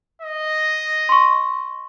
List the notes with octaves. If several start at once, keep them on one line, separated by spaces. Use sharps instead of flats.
D#5
C6 C#6